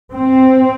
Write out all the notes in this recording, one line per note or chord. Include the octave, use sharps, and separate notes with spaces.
C4